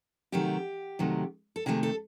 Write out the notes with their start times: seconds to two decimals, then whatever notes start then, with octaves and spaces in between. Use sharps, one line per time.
0.32 C3 D#3 F#3 A3 G4
0.99 C3 D#3 F#3 A3
1.56 A4
1.66 C3 D#3 F#3 A3 G#4
1.83 A4